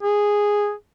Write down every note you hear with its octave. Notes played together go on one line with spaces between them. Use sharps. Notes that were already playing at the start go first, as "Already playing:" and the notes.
G#4